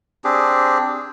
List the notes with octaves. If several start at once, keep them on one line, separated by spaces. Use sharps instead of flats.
C4 D4 G4 G#4